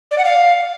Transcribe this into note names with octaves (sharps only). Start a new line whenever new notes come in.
D5
F#5
F5